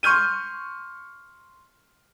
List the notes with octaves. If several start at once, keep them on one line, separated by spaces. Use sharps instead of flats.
C6 C#6 F6 G6 D#7